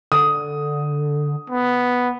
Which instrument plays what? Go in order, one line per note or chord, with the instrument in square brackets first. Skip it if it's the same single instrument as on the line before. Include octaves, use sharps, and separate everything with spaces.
[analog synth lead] D3 [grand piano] D#6
[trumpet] B3